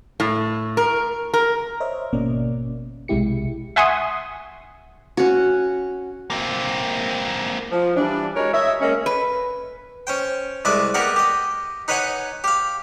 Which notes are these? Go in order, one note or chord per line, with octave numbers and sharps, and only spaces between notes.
A2
A#4
A#4
C5 C#5 D#5 E5
G#1 B2 A#3 C#4 D5
B1 C3 G#3 E4 G4 C#7
E5 F#5 G#5 C6 C#6 D#6
C#4 F#4
A#3 C4
F3
E3 G3 D4
G#3 F#4 A#4 C#5
C#5 D#5 E5
G#3 A#3 C#4
B4
C#4 C5 G5
C2 G#3 B4 D5 E5
A#3 B3 G4 A#4 D5 F#5
G4 D#5
D#4 B4 C#5 D#5 F#5 G#5
G4 F5